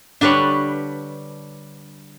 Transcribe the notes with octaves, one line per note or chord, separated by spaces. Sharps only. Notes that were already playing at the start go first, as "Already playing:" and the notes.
D3 G3 D4 B4 C#5